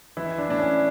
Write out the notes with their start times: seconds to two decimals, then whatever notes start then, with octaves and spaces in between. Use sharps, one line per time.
0.17 E3 E4
0.38 D4
0.49 A2 D4
0.59 C#4